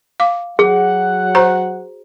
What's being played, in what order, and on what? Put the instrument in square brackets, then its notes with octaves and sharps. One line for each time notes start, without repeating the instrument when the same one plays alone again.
[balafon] F5 D6
[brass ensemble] F#3 F#5 [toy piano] G#4
[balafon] F#4 C5 A#5